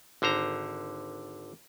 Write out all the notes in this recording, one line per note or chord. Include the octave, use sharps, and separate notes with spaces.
G#1 D3 C5 A#5